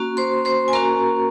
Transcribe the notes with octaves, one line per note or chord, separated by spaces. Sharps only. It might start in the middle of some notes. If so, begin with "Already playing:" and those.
Already playing: A#3 C#4 F#4
C5 C6
C5 C6
G#5
A#3 C#4 F#4 A#4 A#5